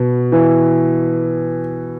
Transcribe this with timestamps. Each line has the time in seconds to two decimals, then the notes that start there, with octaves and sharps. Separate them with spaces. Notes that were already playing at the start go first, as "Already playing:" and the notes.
Already playing: B2
0.32 E3